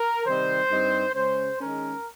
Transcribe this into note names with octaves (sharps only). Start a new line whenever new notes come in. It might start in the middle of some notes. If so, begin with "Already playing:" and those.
Already playing: A#4
C3 D#3 G3 C4 D#4 C5
G2 G3 C4 D#4
C#3 G#3 C#4 C5
D#3 G#3 C#4 A#4